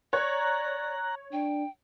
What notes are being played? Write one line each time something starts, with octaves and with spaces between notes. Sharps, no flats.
C#5 D5 A#5 F#6
D4 G5